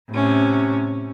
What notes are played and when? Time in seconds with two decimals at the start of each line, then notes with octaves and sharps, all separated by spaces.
0.10 A2 C3 C#4